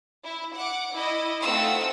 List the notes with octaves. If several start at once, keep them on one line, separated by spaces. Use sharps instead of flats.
E4
F#5 D6
E4 D#5
A3 C4 D#4 F4 F#5 E6